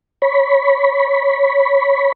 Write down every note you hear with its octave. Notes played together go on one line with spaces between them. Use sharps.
C#5 B5